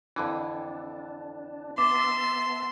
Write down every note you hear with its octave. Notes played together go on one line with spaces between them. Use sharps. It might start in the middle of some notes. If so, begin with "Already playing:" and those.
F2 D3 E3 D4
B3 E5 A5 C6 D6